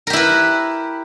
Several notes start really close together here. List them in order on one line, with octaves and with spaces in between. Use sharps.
A#4 G4 E4 B4